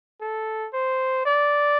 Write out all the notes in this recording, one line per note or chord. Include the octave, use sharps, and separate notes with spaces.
A4
C5
D5